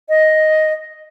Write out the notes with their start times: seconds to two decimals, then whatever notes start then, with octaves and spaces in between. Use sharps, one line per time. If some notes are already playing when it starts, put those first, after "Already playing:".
0.09 D#5